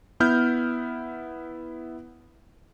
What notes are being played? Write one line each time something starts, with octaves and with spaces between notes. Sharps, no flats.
B3 E4 F6 G6